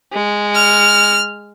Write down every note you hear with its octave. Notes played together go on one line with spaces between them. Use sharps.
G#3
F6